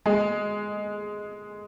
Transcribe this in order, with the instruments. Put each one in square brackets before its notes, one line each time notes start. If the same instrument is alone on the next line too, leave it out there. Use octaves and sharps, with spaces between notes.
[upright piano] G#3